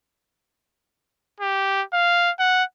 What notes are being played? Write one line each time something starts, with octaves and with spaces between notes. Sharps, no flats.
G4
F5
F#5